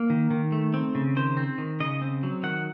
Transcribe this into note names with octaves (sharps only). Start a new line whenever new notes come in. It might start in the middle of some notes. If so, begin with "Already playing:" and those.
Already playing: A#3
D#3
D#3
A3
C4
C#3
D#3 C5
C4
D#3
C#3 D#5
C4
F#3
D#3 F#5